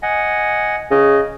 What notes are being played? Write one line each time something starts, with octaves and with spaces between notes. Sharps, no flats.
D#5 F#5 G#5
C#3 D#5